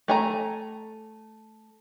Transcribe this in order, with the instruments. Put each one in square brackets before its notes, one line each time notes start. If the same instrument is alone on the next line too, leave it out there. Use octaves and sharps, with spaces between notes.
[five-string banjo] A3 G#5 A#5